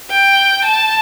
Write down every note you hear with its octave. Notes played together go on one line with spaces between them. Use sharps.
G5
A5